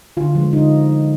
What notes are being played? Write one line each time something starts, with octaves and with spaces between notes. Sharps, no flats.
D3 F4
F3 G#3
D3 D#4